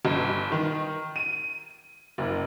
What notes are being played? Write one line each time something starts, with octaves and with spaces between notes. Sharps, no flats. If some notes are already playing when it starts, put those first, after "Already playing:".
G1
D#3
D#7
F#1